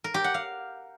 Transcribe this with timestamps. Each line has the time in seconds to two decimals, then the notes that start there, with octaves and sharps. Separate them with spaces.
0.04 A#4
0.14 G4
0.24 F#5
0.34 F5